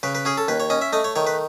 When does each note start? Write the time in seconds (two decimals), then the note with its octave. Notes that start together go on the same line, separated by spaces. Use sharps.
0.03 C#3 B4
0.15 B4
0.25 C#4 G#4
0.38 A4
0.48 D#2 B4
0.60 C#5
0.70 C#4 D#5
0.81 E5
0.93 A3 D#5
1.04 C#5
1.16 D#3 C#5
1.27 B4